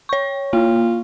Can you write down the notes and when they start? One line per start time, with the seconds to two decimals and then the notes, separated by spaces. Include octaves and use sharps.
0.09 C#5 C#6
0.53 A#3 F4